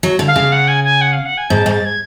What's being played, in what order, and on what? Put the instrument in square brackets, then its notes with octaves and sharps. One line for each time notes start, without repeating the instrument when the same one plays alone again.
[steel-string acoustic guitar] F#3
D3
[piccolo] F5
[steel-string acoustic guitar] C#3
[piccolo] F#5
G#5
G#5
F#5
F5
F#5
G#5
[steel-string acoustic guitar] G#2 [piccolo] A5
[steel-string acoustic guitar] G#2
[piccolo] A6
G#6